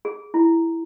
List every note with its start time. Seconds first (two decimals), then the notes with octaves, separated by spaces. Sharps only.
0.05 G#4
0.34 E4